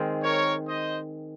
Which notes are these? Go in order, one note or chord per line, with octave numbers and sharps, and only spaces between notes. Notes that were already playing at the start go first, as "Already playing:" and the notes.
Already playing: D#3 G#3 C4
A#4 C#5
C5 D#5